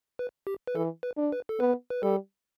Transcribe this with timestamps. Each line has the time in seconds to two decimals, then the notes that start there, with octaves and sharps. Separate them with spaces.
0.19 B4
0.47 G4
0.67 B4
0.75 E3 A4
1.03 B4
1.17 D4
1.32 B4
1.49 A4
1.60 B3 B4
1.90 B4
2.03 G3 A4